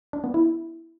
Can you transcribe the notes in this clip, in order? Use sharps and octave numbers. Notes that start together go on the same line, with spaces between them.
D4
B3
E4